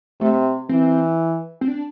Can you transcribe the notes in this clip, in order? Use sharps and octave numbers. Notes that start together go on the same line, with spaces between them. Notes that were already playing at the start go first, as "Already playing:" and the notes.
C3 A3
E3 C4
C4
D4